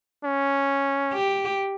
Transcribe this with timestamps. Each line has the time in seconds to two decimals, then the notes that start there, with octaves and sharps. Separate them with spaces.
0.24 C#4
1.13 G4